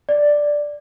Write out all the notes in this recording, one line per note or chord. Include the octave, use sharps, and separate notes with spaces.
D5